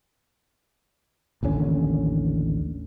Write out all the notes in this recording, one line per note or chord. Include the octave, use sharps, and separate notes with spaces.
A1 D#2 D3 C#4